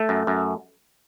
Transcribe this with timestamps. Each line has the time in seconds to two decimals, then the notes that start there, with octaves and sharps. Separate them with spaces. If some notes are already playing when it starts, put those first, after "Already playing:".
Already playing: A3
0.09 F#2
0.27 F#2